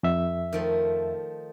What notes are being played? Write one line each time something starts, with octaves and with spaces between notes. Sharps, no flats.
F2 E5
D#3 F3 A3